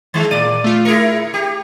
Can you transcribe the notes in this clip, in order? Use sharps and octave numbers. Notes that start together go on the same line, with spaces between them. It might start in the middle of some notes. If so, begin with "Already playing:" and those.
D#3 G#3 A6
A#2 D5 D#7
A3 F4
E4 G#4 A#4 G#6 C#7
G4